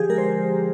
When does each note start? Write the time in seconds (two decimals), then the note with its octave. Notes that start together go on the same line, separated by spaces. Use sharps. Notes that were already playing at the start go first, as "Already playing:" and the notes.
Already playing: D3 F3 G4 G#4
0.09 G#3 A#4
0.18 C5